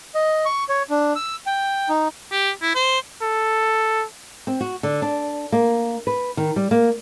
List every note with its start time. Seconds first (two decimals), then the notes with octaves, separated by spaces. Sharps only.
0.14 D#5
0.45 C#6
0.69 C#5
0.90 D4
1.16 E6
1.46 G5
1.89 D#4
2.32 G4
2.62 E4
2.75 C5
3.22 A4
4.47 C4
4.61 F#4
4.83 D3
5.02 D4
5.52 A#3
6.07 B4
6.37 D#3
6.56 G3
6.71 A#3